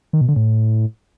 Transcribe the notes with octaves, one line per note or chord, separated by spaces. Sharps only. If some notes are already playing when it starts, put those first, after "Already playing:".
D#3
B2
D3
A2